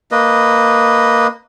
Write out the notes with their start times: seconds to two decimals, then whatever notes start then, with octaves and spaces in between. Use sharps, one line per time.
0.11 A#3 B4 D#5